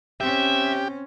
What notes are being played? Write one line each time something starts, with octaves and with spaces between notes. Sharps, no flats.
C4 C#4 G4 E5